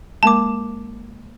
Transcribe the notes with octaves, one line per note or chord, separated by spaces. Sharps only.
G#3 A#3 A#4 A5 D6